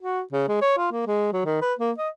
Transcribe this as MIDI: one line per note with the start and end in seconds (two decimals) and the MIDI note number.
0.01 0.21 66
0.33 0.44 49
0.48 0.57 56
0.61 0.76 73
0.77 0.91 65
0.92 1.05 58
1.07 1.29 56
1.33 1.45 54
1.45 1.61 51
1.62 1.74 71
1.79 1.92 58
1.98 2.09 75